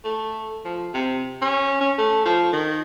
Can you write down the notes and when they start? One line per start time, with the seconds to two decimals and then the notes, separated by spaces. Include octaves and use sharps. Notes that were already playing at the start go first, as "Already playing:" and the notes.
0.04 A3
0.65 F3
0.94 C3
1.42 C#4
1.81 C#4
1.98 A3
2.26 F3
2.53 D#3